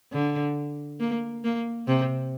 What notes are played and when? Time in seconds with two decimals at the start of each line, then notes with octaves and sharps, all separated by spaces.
0.13 D3
1.00 A#3
1.44 A#3
1.88 C3